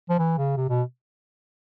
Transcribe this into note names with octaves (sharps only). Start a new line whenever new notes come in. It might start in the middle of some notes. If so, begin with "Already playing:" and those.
F3
E3
C#3
C3
B2